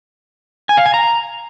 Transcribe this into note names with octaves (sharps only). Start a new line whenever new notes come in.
G#5
F5
G#5
A#5